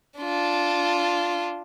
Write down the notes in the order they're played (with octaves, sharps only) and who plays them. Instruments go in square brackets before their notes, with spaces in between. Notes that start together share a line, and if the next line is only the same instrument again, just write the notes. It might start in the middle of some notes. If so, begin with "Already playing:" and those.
[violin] D4 F4